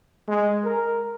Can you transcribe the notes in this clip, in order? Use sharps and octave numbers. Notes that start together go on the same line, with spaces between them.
G#3
A#4